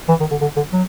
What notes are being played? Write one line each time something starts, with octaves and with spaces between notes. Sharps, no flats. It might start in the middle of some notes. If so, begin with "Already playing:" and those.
E3
D#3
D3
D3
D3
F#3